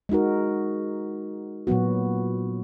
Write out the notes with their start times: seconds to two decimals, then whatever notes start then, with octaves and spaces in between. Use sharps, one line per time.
0.09 G#3 D#4 F#4 A#4
1.67 A#2 F#3 B3 F#4